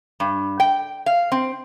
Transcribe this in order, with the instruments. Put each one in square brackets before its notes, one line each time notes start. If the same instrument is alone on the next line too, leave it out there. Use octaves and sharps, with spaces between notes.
[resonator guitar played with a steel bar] G2
G5
F5
C4